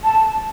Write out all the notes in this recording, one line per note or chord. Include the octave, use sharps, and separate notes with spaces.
A5